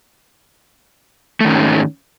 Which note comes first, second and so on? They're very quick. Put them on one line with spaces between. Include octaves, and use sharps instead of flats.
A3 D#3 C#4 G#2